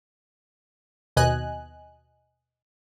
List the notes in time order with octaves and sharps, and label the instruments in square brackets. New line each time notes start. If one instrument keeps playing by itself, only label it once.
[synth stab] D#2 B2 D#5 G#5 F#6